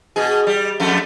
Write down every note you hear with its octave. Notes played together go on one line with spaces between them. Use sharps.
B2 G#4
G3
F2 A3